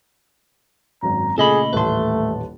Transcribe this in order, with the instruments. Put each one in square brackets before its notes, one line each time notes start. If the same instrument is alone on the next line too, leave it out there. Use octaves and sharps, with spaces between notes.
[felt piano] G#1 F#2 [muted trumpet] A#5
[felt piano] A#2 C#3 A3 [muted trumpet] G#4 [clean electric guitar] A4 D#5 B5
[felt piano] D#1 A1 A5 [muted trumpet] A3 [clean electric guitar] B4 C6